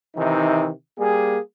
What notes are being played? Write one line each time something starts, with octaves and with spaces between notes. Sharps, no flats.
C3 D#3 E3 D#4
G3 A#3 G#4